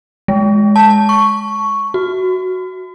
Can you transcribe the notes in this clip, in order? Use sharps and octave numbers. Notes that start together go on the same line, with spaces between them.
G#3
A5
C#6
F#4